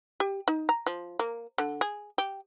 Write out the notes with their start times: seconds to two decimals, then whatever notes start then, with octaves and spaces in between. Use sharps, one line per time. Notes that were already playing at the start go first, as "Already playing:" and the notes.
0.20 G4
0.48 D#4
0.69 A#5
0.86 F3
1.19 A#3
1.58 D3
1.81 G#4
2.18 G4